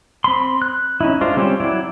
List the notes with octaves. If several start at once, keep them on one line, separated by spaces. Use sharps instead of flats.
C4 B5 C6
F#6
C#4 D#4 E4
G#3 D4 F4 C5
G3 C4 C#4 G4
F#3 E4 D5